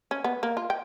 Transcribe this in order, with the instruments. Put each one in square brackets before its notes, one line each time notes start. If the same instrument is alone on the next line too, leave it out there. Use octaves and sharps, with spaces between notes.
[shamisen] C#4
B3
A#3
F4
G5